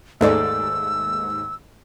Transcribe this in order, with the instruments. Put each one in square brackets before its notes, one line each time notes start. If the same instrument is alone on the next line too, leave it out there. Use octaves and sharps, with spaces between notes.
[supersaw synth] D#2 G#2 [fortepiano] A3 G#4 D5 [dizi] E6